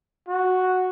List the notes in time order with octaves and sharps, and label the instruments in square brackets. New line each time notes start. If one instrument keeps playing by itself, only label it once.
[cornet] F#4